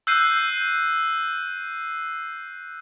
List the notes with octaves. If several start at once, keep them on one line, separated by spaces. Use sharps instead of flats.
E6 F#6 G6 C7 D#7